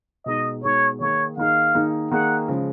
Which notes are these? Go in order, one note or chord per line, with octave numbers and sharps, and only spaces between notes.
B2 G#3 D#4 D#5
B2 G#3 D#4 C#5
D#3 A#3 D#4 G#4 C#5
D#3 A#3 D#4 G#4 F5
D#3 A#3 D#4 G#4
D#3 A#3 D#4 G#4 F#5
C#3 F3 G#3